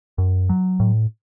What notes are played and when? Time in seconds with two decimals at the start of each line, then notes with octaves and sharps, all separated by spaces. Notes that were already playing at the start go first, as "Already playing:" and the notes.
0.18 F#2
0.49 F#3
0.80 A2